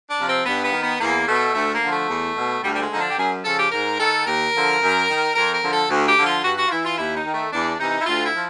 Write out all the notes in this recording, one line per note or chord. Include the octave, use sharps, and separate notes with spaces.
D4
C3 F3
C4
G2 B3
B3
D#3
B3
E2 A#3
B2 A3
D2 A3
A#3
D3 F3
A3
E2
B2
D2 G3
G3
G#3
D3 F3 D#4
D4
G4
F#2 G#4
C#3 F3 A4
G4
G#2 A#4
D#3 A4
D#2 A#4
D3 F3
F#2
D#3
F2 A#4
A#4
D3 F3
A4
D2
G4
D3 F3
F4
G2 F#4
F#4
F4
E3 E4
F4
D#2 E4
D#4
D#3
A3
E2 D4
C3 E3 D#4
E4
D2 F4
E4
F3